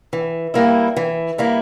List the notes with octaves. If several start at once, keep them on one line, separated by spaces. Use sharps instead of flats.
E3
G3 A#3 E4
E3
G3 A#3 E4